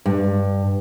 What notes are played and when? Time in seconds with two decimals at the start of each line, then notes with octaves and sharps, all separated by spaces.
0.06 G2